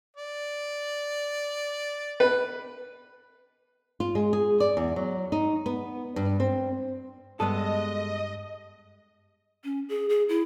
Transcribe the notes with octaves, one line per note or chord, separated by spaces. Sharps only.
D5
B4
F4
G#3
G#4
D5
E2
F#3
D#4
B3
G2
C4
G2 G#3 B3 A4 D#5 D#6 D#7
C#4
G#4
G#4
E4